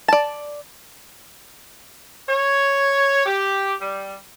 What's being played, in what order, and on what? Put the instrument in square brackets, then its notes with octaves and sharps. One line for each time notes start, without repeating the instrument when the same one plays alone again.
[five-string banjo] D5 A5
[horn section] C#5
G4
G3